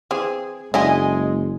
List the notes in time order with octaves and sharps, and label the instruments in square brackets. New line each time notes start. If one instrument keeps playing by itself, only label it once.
[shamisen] E3 C4 [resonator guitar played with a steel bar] G#4
[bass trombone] F#1 [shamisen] D3 E4 F#4 [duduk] G#3 [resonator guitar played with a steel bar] D#5 G#5